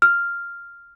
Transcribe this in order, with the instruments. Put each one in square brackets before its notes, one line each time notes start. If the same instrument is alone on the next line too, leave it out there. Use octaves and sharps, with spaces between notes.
[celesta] F6